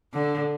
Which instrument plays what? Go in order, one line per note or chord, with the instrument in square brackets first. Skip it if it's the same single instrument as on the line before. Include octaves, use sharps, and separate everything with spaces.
[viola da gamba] D3